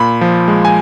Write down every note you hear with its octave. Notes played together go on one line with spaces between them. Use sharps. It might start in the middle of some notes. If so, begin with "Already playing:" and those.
Already playing: A#2 B5
F3
G#3
G#5